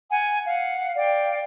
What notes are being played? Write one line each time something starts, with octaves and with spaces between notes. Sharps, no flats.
F#5 G#5
F5 F#5
D5 F5 G5